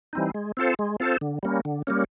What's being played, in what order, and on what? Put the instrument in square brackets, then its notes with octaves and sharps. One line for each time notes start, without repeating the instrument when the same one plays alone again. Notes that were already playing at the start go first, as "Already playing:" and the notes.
[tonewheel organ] E3 G3 C4 D#4
G#3
C4 F4 A4 C5
G#3
C4 F4 A4 C5
D3
G3 A#3 C#4
D3
G3 A#3 C#4